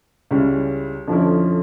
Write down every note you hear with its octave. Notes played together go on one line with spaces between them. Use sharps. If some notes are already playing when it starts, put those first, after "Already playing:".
C#2 C#3 G3 C#4 E4
F2 D3 F3 C#4 E4